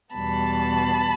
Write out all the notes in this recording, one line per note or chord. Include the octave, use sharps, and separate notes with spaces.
E2 B2 G3 B3 A5 B5